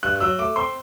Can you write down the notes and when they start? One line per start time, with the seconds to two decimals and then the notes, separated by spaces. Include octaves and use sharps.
0.03 G2 F#6
0.16 F#6
0.20 F#3 E6
0.39 A3 D6
0.56 C4 C6